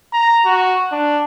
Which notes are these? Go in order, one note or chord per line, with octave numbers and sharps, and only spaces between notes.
A#5
F#4
D4